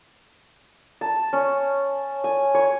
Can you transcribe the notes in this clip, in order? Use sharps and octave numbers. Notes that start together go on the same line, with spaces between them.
A5
C#4
G#5
C#5